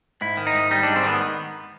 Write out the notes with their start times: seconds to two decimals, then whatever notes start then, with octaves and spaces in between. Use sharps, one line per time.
0.21 G#2 E4
0.37 D#3
0.47 D#4
0.55 G#2
0.71 G3 D#4
0.83 G#2 D4
0.96 C4
1.04 D#3 B3